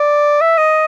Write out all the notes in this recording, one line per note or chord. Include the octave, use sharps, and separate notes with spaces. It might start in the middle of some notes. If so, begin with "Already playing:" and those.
Already playing: D5
E5
D#5